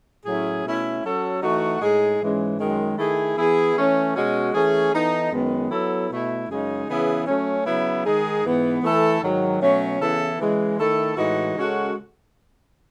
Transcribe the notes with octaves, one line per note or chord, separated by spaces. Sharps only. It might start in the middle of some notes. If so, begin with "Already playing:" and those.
A2 F#3 C#4 E4 G#4
B2 A3 C#4 E4
F#3 C#4 F#4 A4
E3 A3 D#4 F#4
A2 G#3 D#4 G#4
G#2 E3 G#3 C#4
F#2 D#3 G#3
D#3 A3 E4 G#4
E3 B3 E4 G#4
E3 A3 C#4
B2 G#3 C#4 F#4
E3 A3 C#4 G#4
E3 B3 D#4 A4
F#2 D#3 G#3 B3
F#3 B3 E4 A4
B2 A3 E4
F#2 C#3 G#3 D#4 G#4
C#3 E3 B3 E4 G#4
F#3 A3 C#4
C#3 F#3 B3 E4
D#3 G#3 D#4 G#4
G#2 E3 B3
E3 A3 E4 A4
G#2 D#3 F#3
B2 F#3 A3 C#4
C#3 E3 B3 E4 A4
C#3 E3 G#3
D#3 A3 E4 A4
A2 E3 G#3 D#4 F#4
C#3 G#3 C#4 F#4 A4